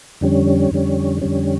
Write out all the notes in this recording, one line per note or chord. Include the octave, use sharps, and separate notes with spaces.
F2 D3 G3 C#4
F2 D3 G3 C#4
F2 D3 G3 C#4